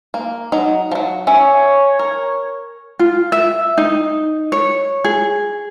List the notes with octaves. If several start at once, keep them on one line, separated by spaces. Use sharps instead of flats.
A#3
F#3 D#4
F3 F#3
C#4 C#5 E5
A#4
F4
E5
D#4
C#5
G#4